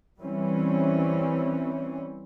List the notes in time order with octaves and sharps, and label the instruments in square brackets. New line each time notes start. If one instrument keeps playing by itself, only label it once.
[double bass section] E3 G3 C4 C#4